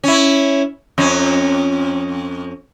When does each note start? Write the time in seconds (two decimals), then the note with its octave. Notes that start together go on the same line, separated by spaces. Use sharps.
0.04 C#4 E4
0.98 F2 C#4